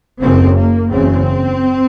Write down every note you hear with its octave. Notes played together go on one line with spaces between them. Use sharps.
F#1 F#2 C#3 C4
A#3
F#1 E2 C#3 C4